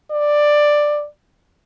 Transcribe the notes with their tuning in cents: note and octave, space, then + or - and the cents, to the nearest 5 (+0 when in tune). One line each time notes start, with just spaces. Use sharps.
D5 +10